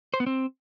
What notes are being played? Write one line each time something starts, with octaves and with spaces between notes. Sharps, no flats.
C5
B3
C4